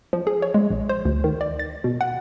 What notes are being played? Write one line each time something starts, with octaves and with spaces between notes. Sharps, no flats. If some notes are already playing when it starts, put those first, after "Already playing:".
F3
G#4
C#5
G#3
A#1
C5
D2
D#3
D5
A6
B2
F#5